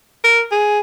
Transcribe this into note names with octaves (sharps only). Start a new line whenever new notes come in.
A#4
G#4